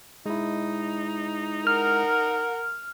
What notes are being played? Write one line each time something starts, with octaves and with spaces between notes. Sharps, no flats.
G#3 D#4 E4
A#4 F#5 F6